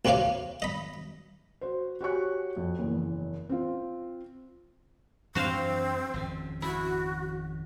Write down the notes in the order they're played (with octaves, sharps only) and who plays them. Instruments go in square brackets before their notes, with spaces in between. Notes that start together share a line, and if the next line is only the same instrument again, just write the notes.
[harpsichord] D2 C3 F#4 C#5 F5 D6
D#5 B5
[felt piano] F#4 C5
F#4 G4 C#5 G#5 C#6 F#6
F2
F#1 E2
C4 F4
[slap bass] F#2 E3 D4 [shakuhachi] C4 [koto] F#4 C5 F5
[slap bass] G#1 F2 C#3
[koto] E4 [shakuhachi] F#4